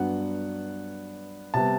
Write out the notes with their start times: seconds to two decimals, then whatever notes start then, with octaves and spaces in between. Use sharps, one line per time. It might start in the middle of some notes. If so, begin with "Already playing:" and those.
Already playing: G2 F#3 B3 D4 F#5
1.54 C3 G3 B3 A5